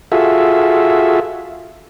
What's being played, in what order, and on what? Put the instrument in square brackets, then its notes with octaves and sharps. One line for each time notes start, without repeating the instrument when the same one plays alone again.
[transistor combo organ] F4 F#4 G#4 A4 E5